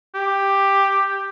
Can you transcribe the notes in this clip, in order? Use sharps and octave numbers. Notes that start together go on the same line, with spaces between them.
G4